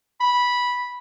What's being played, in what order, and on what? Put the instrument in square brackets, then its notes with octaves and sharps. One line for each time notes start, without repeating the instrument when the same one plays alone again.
[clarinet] B5